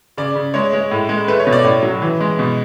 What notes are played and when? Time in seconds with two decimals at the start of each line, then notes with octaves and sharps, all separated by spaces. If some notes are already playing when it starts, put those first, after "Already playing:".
0.17 C#3 D5
0.35 C#3
0.54 G#3 C#5
0.73 G#3
0.91 A2
1.09 G#3
1.28 A3 B4
1.40 C#5
1.47 B2
1.53 D5
1.64 A2 C#5
1.83 F#3
2.02 E3
2.21 G#3
2.39 B2